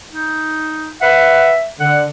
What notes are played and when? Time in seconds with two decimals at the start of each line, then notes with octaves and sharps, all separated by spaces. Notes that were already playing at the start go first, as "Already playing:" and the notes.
0.11 D#4
1.02 B4 E5 F#5
1.80 D3 F#5